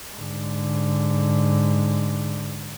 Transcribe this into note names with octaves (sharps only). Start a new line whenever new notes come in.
G#2 D3